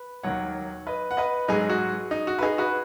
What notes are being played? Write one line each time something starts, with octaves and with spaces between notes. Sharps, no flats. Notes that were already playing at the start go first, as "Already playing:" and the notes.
Already playing: B4
D#2 D#3 F#3 C#5 F#5
B4 D#5
F#5
B4 D#5
G#2 F#3 D#4 G#4
F#4
D#4
F#4
B4
D#4 G#4
F#4 B4